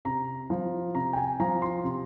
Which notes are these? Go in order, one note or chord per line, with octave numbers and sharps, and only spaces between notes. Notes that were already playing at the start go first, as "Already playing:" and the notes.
C3 A#5
F3
C3 A#5
G5
G#5
F3 A#5
C6
C3